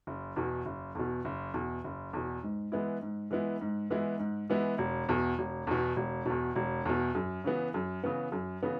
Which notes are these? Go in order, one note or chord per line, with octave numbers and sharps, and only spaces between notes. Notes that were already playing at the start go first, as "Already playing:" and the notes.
F#1
E2 B2
F#1
E2 B2
F#1
E2 B2
F#1
E2 B2
G#2
E3 G#3 B3 E4
G#2
E3 G#3 B3 E4
G#2
E3 G#3 B3 E4
G#2
E3 G#3 B3 E4
E1
E2 B2
E1
E2 B2
E1
E2 B2
E1
E2 B2
F#2
C#3 E3 B3
F#2
C#3 E3 B3
F#2
C#3 E3 B3